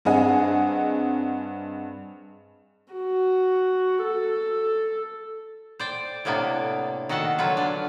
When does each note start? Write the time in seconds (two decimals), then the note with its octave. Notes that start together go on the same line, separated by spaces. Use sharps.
0.05 G2 C4 G#4 D#5 F#5 G#5
2.93 F#4
4.03 A4
5.80 C5 D5 G5
6.25 A2 C3 A#3 B3 D4
7.09 D#3 F#4 A4 F#5 A5
7.39 D3 F#3 F4 B4
7.57 D4